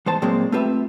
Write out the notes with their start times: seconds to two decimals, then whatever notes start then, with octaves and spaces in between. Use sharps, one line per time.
0.06 E2 G#2 C5 A5
0.22 A#2 F#3 G#3 A#3 C4
0.52 A3 C4 F4 G4 B4 E5